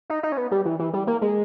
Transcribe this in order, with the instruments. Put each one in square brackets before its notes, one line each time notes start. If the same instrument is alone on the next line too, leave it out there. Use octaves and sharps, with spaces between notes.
[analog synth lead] D#4
D#4
C#4
B3
G3
E3
E3
G3
A#3
G#3